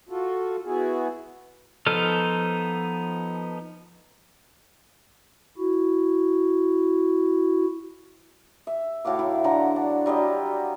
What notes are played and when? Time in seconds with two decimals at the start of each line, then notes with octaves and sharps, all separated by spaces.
0.09 F4 F#4 A4
0.65 B3 E4 F#4 G#4
1.86 F3 B3 D#4 A4 F6
5.58 E4 F#4
8.67 E5
9.05 A2 F#4 F5 D6
9.19 F#3 E4
9.44 D3 C5 A#5
9.76 D4
10.06 F#3 G3 F4 D#5